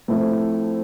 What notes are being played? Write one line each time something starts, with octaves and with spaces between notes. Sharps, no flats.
F3 A3 C4 E4